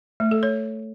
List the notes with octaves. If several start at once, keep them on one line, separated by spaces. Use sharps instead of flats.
A3
A4
C#5